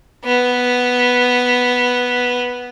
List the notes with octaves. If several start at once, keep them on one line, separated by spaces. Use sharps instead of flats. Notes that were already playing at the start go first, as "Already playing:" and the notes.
B3